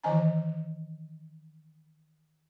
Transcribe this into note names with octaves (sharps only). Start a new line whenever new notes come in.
D#3 E3 D#5 G#5 A#5